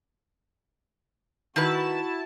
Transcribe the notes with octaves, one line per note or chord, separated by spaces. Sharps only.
D#3 E4 F#4 B4 A5